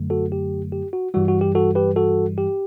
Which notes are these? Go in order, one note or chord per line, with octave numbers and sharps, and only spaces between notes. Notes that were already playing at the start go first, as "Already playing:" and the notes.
Already playing: F#2 D3 F#3 A3
F#4 A4
G4
G4
F#4
G2 E3 G3 F#4
F#4
G4
F#4 A4
G4 B4
F#4 A4
G4